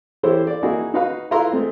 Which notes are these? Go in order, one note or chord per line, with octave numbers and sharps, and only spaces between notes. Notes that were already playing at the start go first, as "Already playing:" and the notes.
E3 E4 G4 A4 C5 C#5
A4 D5
A#3 D#4 E4 F#4 G#4
D#4 F#4 B4 F5
E4 F4 A4 B4 A#5 C6
G#3 A3 C4